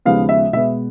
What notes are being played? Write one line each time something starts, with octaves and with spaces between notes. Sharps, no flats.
D#2 C#3 F3 G#3 B3 F5
E5
B2 G#3 B3 E5